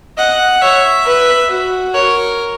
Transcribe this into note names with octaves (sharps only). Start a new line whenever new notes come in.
D#5 F#5
C#5 E5
B4
F#4
A#4 C#5